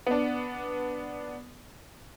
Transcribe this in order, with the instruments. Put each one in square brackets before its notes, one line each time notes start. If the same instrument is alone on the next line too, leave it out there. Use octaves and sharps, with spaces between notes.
[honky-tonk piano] B3 D4